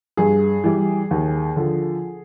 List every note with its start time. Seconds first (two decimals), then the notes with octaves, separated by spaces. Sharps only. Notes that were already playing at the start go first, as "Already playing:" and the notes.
0.17 G2 G#4
0.64 E3 G3
1.11 D#2
1.56 D3 F3